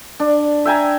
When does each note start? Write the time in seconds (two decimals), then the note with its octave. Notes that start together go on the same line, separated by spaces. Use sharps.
0.20 D4
0.65 E5 G5 G#5 A#5